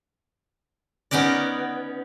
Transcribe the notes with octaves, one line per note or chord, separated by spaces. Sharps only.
B3 C#4 D#4 A#4 D5